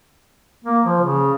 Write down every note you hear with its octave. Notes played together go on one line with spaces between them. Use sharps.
A#3
F3
C#3